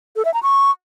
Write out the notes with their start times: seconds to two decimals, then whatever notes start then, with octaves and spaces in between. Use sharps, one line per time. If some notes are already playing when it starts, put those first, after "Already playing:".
0.16 A4
0.25 E5
0.34 A#5
0.43 C#6